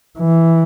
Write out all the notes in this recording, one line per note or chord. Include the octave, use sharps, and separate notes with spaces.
E3